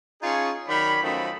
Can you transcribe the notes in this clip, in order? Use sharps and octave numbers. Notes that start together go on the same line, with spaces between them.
C#4 D#4 F4 G#4 C#5 A5
D#3 F#3 D5 B5
F#2 D#3 F3 A3 D#5 B5